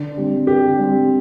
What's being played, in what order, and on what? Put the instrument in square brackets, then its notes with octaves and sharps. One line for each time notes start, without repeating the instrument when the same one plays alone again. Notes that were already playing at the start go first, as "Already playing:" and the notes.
Already playing: [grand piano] D3
G3 C4
[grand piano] D3 [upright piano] G4
[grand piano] G3 C4